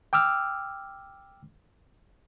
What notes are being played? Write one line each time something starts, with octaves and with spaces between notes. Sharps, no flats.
G5 D6 E6 F6